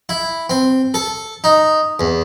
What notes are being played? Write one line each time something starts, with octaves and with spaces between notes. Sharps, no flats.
E4
C4
A4
D#4
E2